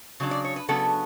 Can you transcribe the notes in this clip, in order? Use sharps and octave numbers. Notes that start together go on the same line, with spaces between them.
C#3 F#3 D4
D5
C#5
B4
C#3 F#3 B3 D4 A4